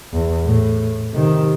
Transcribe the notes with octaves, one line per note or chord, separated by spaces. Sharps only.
E2
A2
C3 D#3